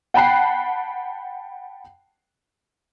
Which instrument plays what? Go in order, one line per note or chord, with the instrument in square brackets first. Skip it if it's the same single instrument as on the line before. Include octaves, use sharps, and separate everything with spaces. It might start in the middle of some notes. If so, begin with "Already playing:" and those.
[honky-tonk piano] F#5 G5 A5 B5 F#6 C7